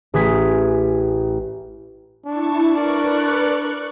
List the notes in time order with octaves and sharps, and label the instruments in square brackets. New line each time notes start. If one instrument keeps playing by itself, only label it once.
[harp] A1 G#4 D#6 G#6 B6
[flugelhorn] D4 [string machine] E4 A5 C#6
[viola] A#4 D5 [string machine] B4 C#6 F#6